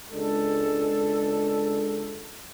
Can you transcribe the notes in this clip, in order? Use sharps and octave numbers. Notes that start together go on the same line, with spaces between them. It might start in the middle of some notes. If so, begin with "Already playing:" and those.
C#2 G#3 D4 A4